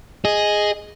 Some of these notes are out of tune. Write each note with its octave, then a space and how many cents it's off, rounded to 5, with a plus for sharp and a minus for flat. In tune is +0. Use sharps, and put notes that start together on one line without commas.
G#4 +0 D#5 +0